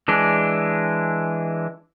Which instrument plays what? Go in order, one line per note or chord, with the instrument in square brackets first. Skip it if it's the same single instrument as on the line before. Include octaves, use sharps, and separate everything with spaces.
[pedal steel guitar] E3 G#3 D4